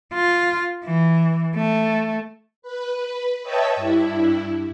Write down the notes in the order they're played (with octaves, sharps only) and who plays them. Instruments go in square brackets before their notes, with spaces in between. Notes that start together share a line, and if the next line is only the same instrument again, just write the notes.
[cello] F4
E3
A3
[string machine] B4
B4 C#5 D#5 E5 G5 A5
G2 E4